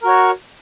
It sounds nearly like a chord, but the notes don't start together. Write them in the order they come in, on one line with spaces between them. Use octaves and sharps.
A#4 F#4 C#5